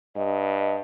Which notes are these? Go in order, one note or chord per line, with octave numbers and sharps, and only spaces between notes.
G2 D#5